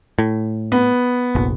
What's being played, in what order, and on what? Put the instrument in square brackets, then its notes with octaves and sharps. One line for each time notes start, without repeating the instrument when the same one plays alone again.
[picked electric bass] A2
[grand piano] B3
[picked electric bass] F1 A#1